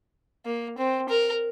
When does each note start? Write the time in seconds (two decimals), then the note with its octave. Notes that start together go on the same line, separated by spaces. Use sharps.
0.46 A#3
0.78 C4
1.09 A#4